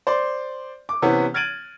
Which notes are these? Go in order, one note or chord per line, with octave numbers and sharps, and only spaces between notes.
C5 D5 C6
D6
C3 E3 B3 C#4
F6 G#6 A6 D7 D#7 F#7